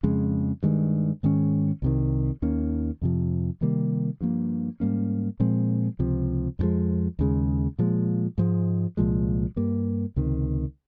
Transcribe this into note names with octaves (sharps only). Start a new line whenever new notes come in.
F2 C#3 G#3
G2 D#3 G#3
G#2 D#3 G#3 C#4
C2 C3 D#3
D#2 D#3 A#3 C#4
F2 C3 F3
C3 D#3 G3 A#3
G2 F3 A#3
G#2 G3 A#3 C#4
A#2 F3 G#3 C4
C#2 C3 F3
F2 C#3 F3 G#3
D#2 C#3 G#3
A#2 F3 G#3
G#2 F3 G#3
C2 A#2 F3 G#3
G2 G3 A#3
C#2 C3 D#3